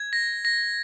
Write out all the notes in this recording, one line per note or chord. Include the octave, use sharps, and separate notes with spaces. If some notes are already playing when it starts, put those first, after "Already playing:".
Already playing: G#6
A#6
A#6